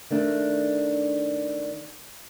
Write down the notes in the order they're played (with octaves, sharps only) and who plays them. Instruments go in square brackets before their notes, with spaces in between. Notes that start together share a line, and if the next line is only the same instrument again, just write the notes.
[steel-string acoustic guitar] D#3 A3 D4